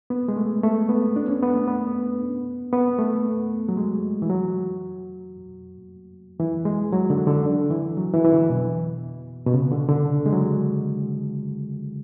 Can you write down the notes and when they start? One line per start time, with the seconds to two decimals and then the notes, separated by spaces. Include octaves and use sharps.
0.10 B3
0.28 G#3
0.36 A3
0.64 A3
0.89 B3
1.16 D4
1.25 B3
1.28 C#4
1.42 B3
1.54 A3
1.67 B3
2.73 B3
2.99 A3
3.69 F#3
3.77 G#3
4.22 E3
4.30 F#3
6.40 E3
6.65 G#3
6.92 F#3
7.10 D3
7.27 D3
7.70 E3
7.97 F#3
8.14 E3
8.24 E3
8.32 D3
8.50 B2
9.47 B2
9.54 C#3
9.71 D3
9.88 D3
10.26 G#3
10.33 F#3